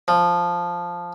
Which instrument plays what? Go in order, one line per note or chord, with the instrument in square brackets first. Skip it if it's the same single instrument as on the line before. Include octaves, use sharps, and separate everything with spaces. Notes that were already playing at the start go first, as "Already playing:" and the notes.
[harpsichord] F3